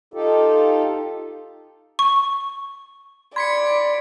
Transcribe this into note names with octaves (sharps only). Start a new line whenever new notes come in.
D#4 F4 G4 A4
C#6
D5 B5 C6 G#6 B6 C#7